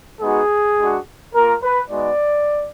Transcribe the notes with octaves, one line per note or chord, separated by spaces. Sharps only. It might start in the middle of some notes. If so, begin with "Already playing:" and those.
G#3 B3 D#4 F#4 G#4
G#3 D4 F#4
A#3 F4 A#4
B4
G#3 B3 D#4 F#4 D5